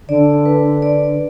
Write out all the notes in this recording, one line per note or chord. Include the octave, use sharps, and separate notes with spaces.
D3 D5
B4
D5